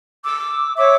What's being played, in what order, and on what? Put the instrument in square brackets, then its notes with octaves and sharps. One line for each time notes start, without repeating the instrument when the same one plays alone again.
[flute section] D6 E6
C#5 E5 D6 E6